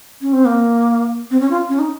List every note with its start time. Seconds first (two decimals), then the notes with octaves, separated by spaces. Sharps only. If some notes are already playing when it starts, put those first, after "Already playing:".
0.21 C#4
0.33 C4
0.45 A#3
1.31 C4
1.40 C#4
1.51 F4
1.69 C#4
1.79 D#4